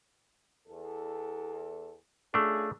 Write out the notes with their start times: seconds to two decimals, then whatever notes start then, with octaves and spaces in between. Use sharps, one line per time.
0.68 E2 A4
2.34 A3 C#4 D4 F4 G#4